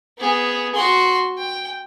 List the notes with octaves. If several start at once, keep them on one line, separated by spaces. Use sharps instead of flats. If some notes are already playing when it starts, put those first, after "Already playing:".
B3 G#4
F#4 C6
G5